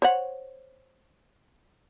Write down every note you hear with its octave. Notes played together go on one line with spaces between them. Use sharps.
C5 C#5 F#5